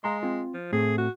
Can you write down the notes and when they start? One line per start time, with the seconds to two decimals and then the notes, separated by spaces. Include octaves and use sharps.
0.04 G#3 F5 A#5 C6
0.23 C4 F4
0.54 F3
0.73 A2 A3 C4 G#4
0.98 F#4